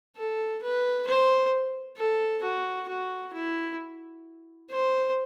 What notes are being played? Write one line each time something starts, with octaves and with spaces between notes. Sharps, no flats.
A4
B4
C5
A4
F#4
F#4
E4
C5